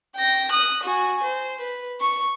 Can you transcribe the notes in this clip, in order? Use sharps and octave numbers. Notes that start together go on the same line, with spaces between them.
G5 A#6
D#6 F#6
F#4 G#5
C5
B4
C#6